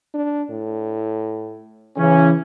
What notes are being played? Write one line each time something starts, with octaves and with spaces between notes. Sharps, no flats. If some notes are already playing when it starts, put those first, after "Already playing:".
D4
A2
C#3 E3 C#4